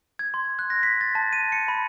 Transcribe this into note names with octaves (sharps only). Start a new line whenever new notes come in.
G#6
C6
F#6
A#6
B6
A6
A5
D#7
C#7
B5